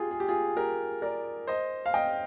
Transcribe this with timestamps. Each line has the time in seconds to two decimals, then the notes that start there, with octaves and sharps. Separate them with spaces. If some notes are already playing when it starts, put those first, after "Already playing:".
Already playing: F4 G4 G#4
0.11 G#4
0.20 G4
0.28 F4 G#4
0.56 G4 A#4
1.02 A#4 D5
1.47 C5 D#5
1.86 F5
1.94 D#5 G5